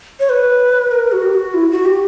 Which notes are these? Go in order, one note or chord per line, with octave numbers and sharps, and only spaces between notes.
C#5
B4
A#4
F#4
G4
F#4
E4
F#4
G4